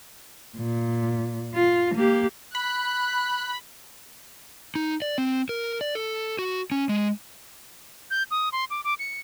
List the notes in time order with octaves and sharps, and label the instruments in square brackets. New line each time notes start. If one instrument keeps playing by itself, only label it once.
[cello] A#2
F4
A#3 G4
[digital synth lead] B5 [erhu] F#6
[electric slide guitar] D#4
D5
C4
A#4
D5
A4
F#4
C#4
G#3
[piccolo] G6
D#6
C6
D6
D6
C#7